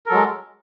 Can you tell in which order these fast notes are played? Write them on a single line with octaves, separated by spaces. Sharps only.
A#4 A4 F#3 G#3